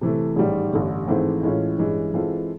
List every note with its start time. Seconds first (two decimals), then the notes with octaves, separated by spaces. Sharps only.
0.01 C3 E3 A3
0.36 A1 G#2 D#3 G3
0.72 A1 G2 D3
1.08 G#1 G#2 E3 A3 C4
1.43 A2 E3 G#3 C#4 F4
1.79 G2 E3 G#3 C#4
2.14 E3 G#3 C4 F4 A4